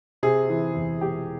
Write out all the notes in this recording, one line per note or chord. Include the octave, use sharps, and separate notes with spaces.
C3 G#4
E3
E2
E1 G4